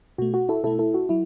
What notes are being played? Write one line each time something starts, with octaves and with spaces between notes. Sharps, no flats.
B2 A3 F#4
F#4
E4 A4
B2 A3 E4 A4
E4 A4
F#4
F#3 E4